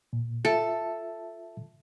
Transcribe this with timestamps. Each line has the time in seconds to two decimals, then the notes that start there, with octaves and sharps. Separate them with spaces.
0.13 A#2
0.45 F4 A4 E5 A5